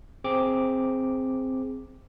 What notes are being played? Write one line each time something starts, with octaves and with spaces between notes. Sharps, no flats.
C4 G#4 D6